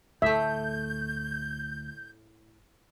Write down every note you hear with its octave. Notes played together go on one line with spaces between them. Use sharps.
D2 A2 A3 E5 G6